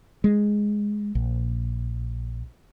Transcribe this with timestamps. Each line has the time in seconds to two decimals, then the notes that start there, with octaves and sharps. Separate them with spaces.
0.24 G#3
1.15 A#1